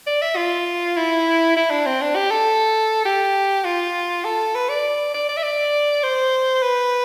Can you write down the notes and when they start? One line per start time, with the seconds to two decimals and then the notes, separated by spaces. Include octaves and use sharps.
0.07 D5
0.22 E5
0.36 F4
0.97 E4
1.56 E4
1.71 D4
1.86 C4
2.01 D4
2.16 G4
2.31 A4
3.05 G4
3.65 F4
4.25 A4
4.55 B4
4.69 D5
5.14 D5
5.29 D5
5.37 E5
5.43 D5
6.03 C5
6.63 B4